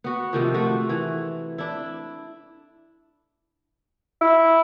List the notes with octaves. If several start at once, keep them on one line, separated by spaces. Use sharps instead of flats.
B3 F#4
C3 D#3 F3
A3 F#4
E3
D4 E4
E4